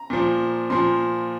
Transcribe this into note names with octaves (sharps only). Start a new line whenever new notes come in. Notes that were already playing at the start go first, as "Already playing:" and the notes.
Already playing: A#5
A#2 F3
A#2 F3 C6